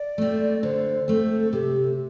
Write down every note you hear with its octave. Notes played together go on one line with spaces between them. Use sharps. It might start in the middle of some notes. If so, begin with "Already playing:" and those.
Already playing: D5
A3 C4
D3 C5
A3 C4 A4
C3 G4